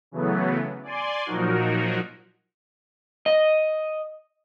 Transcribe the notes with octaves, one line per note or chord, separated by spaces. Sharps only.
C#3 E3 F#3 A3 B3
D5 G#5 C6
A#2 F3 F#3 D#4 F#4 A#4
D#5